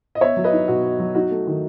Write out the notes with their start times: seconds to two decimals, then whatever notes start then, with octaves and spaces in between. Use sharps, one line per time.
0.15 D#5
0.21 B3 C#5 E5
0.37 F#3
0.44 B4 D#5
0.52 D#4
0.68 B2 F#4
0.84 B3
1.00 F#3
1.15 D#4 F#4
1.31 A3
1.47 D#3